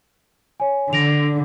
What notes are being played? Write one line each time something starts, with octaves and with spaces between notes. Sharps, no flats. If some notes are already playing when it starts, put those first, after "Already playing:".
C#5 G#5
D3 A#6 D7 F7